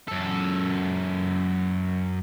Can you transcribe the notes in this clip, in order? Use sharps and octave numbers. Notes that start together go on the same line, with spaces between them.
F#2 A4